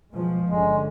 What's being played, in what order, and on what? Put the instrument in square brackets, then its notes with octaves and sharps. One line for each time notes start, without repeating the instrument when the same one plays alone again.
[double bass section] B2 F3 G#3
[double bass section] G1 D3 C#4 [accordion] G#3